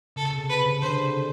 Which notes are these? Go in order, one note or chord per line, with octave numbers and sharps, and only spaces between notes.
C#3 A4
C3
B4
C#3
D3 C5